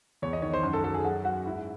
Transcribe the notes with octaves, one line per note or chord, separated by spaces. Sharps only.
E2 C#5
D#5
D#3 C#5
C5
F#2
A4
F#3 A4
G#4
F#3 F#4
F#3 F#4
G#2 E4